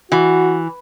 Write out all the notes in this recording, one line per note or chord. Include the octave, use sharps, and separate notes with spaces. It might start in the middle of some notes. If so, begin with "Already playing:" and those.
E3 F#4